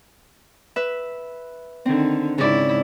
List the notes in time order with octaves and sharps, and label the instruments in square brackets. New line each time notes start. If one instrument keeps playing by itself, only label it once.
[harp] B4 E5
[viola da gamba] D3 D#3 [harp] C4
[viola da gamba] G#2 E4 [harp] C#3 D5